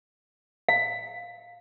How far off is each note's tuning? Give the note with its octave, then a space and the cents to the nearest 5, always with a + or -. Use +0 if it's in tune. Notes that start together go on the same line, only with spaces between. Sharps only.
F5 +10